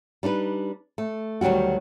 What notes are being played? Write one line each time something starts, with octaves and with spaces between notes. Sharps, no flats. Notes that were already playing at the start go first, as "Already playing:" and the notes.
G3 D4 D#4 B4
A3
D2 D#3 F#3 G3 F#4